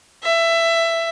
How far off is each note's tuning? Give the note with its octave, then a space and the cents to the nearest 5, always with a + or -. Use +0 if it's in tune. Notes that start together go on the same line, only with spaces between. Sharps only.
E5 +15